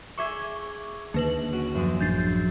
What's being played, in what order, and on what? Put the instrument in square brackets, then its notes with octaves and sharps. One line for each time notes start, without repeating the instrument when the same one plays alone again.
[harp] G#4 E5 C#7 [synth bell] C#6 D6 G#6
[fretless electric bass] D#2 D3 [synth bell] A#3 B4 F#7
[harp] C#4 F#4 D7
F#2 F3 G#3
[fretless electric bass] A1 D4 [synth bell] G6 A6 C7